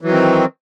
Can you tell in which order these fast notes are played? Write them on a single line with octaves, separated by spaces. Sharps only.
E3 F#3 D#3 C4